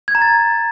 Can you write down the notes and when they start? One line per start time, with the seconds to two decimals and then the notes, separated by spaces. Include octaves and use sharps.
0.08 G#6
0.15 A#5
0.22 A6